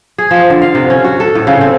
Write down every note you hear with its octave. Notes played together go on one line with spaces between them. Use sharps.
G#4
F3
D3
F5
C3
C#4
F#4
A4
A2
C#3
C4